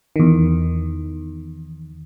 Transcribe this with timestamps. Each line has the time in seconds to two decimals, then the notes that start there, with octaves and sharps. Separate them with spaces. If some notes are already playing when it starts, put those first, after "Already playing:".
0.16 E2 D#3